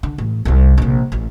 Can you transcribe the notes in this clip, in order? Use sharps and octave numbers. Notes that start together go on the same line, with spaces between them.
D3
A1
C2 C3
A#1 C3
A1